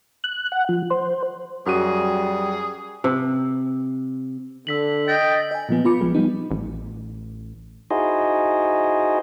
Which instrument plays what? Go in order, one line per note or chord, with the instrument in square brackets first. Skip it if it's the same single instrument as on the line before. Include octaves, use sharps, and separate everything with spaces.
[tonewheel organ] F#6
F#5
F3
C5
[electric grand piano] F#2 F#4 D#7 [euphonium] G3 [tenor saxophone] G#4
[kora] C3
[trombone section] D3 [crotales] E6 B6 F#7
[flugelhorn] D#5 [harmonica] G5 [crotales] A6 A#6
[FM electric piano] D#5 G#5
A#2 F3 B3
B3 F4 B5 D6 C#7
A#1 F3 G#3 B3
F3 G3 B3 D#4
[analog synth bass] A1
[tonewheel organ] D#4 E4 F#4 G#4 C5 D#5